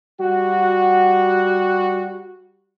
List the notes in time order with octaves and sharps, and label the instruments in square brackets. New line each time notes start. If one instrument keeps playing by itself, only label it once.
[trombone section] G3 F#4